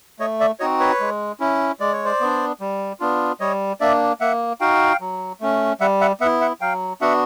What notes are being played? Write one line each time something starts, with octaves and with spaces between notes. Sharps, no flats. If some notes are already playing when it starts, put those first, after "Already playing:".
A3 C#5 D#5
D5 E5
C4 D#4 F#4 C#5 D#5
B4 C#5
G#3
C#4 E4
G#3 D5
C#5
C5 D5
B3 D4
G3
B3 D4 F4
G3 C#5 D#5
A#3 D4 D5 E5
A#3 E5 F#5
D#4 F#4 F5 G5
F#3
A3 C#4
G3 E5 F#5
E5 F#5
B3 E4 E5 F#5
E5 F#5
F#3 F5 G5
B3 D4 F#4 E5 F#5